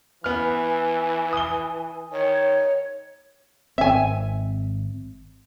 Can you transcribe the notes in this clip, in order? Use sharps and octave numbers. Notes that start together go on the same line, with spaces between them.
E3 B3 G#5 F6
D#6 G7
D#3 C#5
G#1 C4 E5 G#5